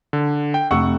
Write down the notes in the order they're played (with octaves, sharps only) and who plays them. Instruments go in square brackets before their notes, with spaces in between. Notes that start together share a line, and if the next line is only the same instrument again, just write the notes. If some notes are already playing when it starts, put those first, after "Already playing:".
[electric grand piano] D3
G5
[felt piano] F1 [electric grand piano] F#5 C#6 E6